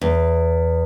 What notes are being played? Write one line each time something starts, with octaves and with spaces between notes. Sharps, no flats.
E2